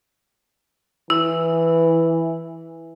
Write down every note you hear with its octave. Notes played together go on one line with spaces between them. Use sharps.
E3 E4